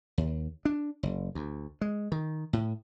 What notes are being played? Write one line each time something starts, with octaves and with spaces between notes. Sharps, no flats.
D#2
D4
F#1
D2
G#3
D#3
A2